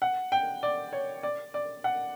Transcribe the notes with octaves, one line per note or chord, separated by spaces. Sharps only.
F#5
G5
D5
C#5
D5
D5
F#5